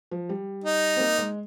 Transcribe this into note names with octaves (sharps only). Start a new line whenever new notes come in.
F3
G3
D#4
C4
A#3
G#3